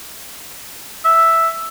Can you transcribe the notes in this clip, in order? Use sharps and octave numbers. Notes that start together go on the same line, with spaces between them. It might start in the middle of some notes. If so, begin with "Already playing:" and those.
E5